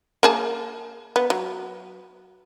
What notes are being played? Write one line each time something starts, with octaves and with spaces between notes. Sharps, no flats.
A#3 G#4 A5
B3
F#3